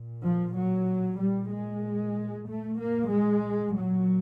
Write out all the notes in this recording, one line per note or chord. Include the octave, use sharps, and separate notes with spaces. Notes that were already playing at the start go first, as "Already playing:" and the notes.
Already playing: A#2
F3
F#3
A#2 G3
G#3
A#2 A3
A#3
G#3
A#2 F#3